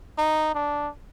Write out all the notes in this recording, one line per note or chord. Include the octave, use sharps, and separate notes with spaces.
D#4
D4